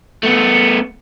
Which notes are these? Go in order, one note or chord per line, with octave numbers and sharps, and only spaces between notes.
A3 B3